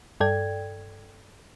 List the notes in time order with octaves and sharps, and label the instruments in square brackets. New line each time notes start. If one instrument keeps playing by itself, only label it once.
[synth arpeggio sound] G2 A4 D5 G5 G#6